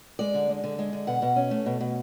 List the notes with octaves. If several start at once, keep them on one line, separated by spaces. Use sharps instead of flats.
G#3 D5
D3
G#3
D3
G#3
D3
B2 F#5
B2
C#4
A3
B2
B2